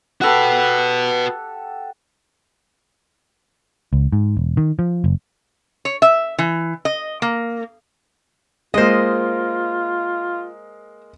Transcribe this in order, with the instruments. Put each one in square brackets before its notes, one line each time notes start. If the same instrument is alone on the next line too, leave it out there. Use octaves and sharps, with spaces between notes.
[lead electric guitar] F#4 B4 [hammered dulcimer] G4 A4 F#5
[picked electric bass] C#2
G#2
E1
D#3
F3
F#1
[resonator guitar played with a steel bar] C#5
E5
E3
D#5
A#3
[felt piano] G#3 A#3 [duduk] F4 [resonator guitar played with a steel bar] C5 D#5